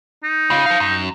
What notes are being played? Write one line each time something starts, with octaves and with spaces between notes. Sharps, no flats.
D#4
C#3 F4
A4 F5
F#2